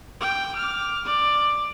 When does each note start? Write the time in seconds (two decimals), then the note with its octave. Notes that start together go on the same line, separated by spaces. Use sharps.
0.21 G5
0.56 D6 F6
1.05 D5